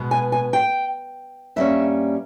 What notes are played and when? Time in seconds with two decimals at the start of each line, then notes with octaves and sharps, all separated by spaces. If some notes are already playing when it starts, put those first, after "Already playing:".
Already playing: B2 G#3 B3
0.11 G#5
0.32 G#5
0.53 G5
1.56 G2 G3 A#3 C#4 E5